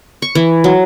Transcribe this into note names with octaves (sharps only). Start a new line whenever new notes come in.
C#6
E3
F#3